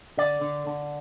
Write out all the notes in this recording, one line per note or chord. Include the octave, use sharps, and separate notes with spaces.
D3 D5
D3
D3